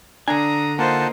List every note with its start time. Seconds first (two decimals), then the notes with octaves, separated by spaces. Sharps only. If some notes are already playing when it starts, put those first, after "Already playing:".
0.28 D3 D4 G#5 A#5 D#6
0.79 A#3 D#4 F4 C5 F#5 A5